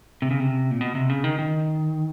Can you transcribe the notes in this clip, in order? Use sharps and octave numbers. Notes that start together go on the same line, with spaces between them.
C3
C#3
C3
A#2
B2
C3
C#3
D#3
D#3